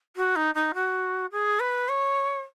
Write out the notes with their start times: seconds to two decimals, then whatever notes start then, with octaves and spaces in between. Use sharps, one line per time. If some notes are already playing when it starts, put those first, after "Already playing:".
0.16 F#4
0.36 D#4
0.54 D#4
0.74 F#4
1.31 G#4
1.60 B4
1.88 C#5